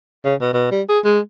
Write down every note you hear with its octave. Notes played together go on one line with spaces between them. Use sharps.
C#3
B2
B2
G3
G#4
G#3